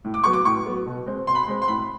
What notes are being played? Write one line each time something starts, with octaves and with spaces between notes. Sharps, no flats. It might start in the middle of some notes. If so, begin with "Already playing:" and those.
A2
D6
F#3 B3 C#6
D6
A2 C#6
F#3 B3
B2
G#3 C4
B2 C6
B5
C6
G#3 C4
C6
A2 B5